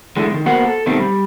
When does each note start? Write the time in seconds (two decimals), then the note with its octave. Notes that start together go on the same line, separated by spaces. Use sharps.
0.16 D3 E3 G#3 A3
0.31 B2 D#3
0.46 A#3 B3 F#4 A#4 C5 F#5
0.65 A4
0.86 B2 D#3 G3 A3 C4
0.99 G3